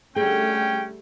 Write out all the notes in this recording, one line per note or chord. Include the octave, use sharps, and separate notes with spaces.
D3 G3 A3 C#4 G#4 G5